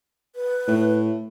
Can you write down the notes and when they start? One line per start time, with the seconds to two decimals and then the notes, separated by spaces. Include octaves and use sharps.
0.36 B4
0.67 A2